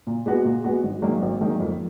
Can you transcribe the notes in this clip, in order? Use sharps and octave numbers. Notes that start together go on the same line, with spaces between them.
A#2
G#3 B3 F#4
A#2
G#3 B3 F#4
G#1
G#2 D#3 F#3 A#3
G#1
G#2 D#3 F#3 A#3
F2